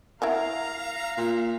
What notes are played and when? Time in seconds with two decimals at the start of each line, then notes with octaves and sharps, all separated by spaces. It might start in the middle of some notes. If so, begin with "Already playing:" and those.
0.22 E4 F#4 A#4 F5 A#5
1.18 A#2